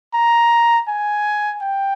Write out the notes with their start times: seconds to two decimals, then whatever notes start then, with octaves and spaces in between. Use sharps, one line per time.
0.14 A#5
0.88 G#5
1.61 G5